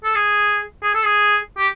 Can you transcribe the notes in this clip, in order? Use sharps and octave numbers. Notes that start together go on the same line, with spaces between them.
A4
G#4
G#4
A4
G#4
G4